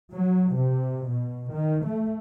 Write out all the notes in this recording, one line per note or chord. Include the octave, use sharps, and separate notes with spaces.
F#3
C3
B2
D#3
A3